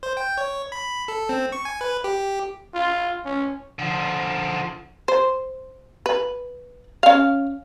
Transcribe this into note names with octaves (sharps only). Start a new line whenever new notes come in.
C5
G5
C#5
B5
A4
C4
C#6
G#5
B4
G4
F4
C#4
D3 F3
C5
B4
C#4 F5